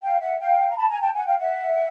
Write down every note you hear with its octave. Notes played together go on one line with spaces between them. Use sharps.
F5 G5
E5 F#5
F5 G5
A#5
A5 B5
G#5 A#5
G5 A5
F#5 G#5
F5 G5
E5 F#5